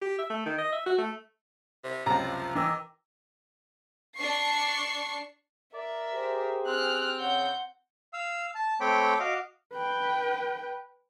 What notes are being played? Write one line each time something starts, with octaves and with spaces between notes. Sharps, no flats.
G4
E5
A3
D#3
D#5
E5
F#4
A3
C3
C#2 F#2 C3 F3 A#5
D#3 E3 G5 D6 E6
D4 C#6 C7
A#4 D5 E5
G4 G#4 C5
C4 F6 F#6
C#3 F#5 G6
F5 E6
A5
A3 C4 C#5 G5 B5 D6
F#4 D#5 F5 D6
B4 G5